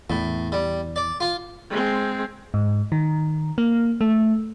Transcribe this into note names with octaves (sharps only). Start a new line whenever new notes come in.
E2 A2
G3
D5
F4
G#3 C4
G#2
D#3
A#3
A3